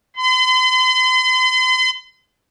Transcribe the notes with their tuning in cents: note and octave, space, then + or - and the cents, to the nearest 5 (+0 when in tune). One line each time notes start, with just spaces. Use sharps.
C6 -45